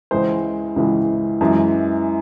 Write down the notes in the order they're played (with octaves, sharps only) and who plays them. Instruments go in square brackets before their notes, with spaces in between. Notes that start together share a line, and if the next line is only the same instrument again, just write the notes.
[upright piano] C#2 C#3 E3 G#3 C5
C#2 C#3 E3 G#3
F#2 E3 G#3